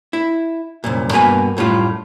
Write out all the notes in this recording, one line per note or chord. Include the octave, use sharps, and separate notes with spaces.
E4
C2 F#2 A#2
G2 B2 A#3 B4 G#5
F#2 A2 G3 F4